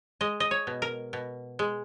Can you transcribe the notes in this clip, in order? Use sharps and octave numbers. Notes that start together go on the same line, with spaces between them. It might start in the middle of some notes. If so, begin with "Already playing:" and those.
G#3 D#5
D#5
C#5
B2
A#4
B2
G#3